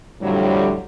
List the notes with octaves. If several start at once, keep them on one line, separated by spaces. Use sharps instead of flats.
F2 A2 D3 F#3 G3